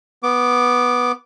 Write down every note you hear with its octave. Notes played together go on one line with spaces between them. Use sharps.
B3 D6